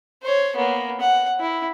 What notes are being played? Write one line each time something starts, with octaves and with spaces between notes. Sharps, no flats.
C5 C#5
A#3 B3
F#5
E4